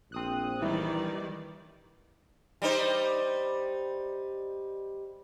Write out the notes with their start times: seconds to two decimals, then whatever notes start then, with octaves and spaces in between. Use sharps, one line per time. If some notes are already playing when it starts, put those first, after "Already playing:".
0.12 A#1 C4 D#6 F#6
0.62 D#3 E3 G3 E4 D5
2.62 G3 D#4 C5